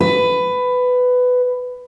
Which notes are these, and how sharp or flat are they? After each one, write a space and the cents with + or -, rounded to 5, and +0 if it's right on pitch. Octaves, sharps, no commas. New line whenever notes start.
B4 +15